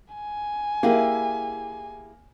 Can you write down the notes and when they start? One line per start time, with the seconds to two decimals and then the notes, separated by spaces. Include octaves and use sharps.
0.14 G#5
0.83 A#3 E4 G4 G#4